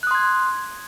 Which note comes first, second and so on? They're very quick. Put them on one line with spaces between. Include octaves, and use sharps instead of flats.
F#6 D#6 C6 G#6